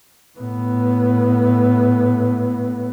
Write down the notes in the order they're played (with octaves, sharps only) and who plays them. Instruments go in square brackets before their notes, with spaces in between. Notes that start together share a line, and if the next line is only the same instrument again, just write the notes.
[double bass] A2 B3